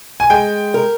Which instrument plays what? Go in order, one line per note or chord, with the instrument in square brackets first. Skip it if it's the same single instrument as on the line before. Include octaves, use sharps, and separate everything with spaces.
[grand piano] G#5
[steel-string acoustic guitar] G#3 [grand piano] G5
[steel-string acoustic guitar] A#4